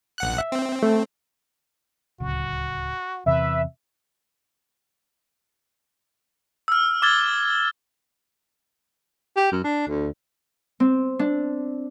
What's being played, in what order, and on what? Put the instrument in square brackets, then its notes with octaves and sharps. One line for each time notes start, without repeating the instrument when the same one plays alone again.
[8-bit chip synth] A#1 F#5 F#6
[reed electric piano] E5
[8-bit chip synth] C4
[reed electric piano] A3
[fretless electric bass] D1 C#2 [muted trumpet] F#4
[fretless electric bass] E2 C3 [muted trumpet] B4 [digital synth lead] E5
[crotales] E6 F6
D6 E6 F6 G#6 A6 G7
[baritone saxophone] G4
F#2
D4
D2
[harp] C4
D4